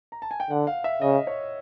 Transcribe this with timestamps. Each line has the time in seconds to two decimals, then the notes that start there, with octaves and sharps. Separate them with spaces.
0.12 A#5
0.22 A5
0.31 G#5
0.40 G5
0.50 D3 F#5
0.67 F5
0.84 E5
1.02 C#3 D#5
1.27 C#5